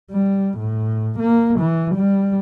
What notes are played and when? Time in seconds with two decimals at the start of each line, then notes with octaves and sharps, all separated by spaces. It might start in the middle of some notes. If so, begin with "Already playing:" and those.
0.12 G3
0.58 A2
1.20 A#3
1.60 E3
1.96 G3